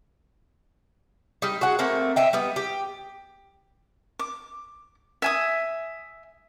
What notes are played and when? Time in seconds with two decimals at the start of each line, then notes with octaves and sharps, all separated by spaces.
1.42 G3 D#4
1.61 F#4 G#4 F#5
1.79 A3 A#3 C4
2.16 D#5 E5 G5
2.33 G3 B3
2.56 G4
4.19 D6
5.22 E5 G#5 D#6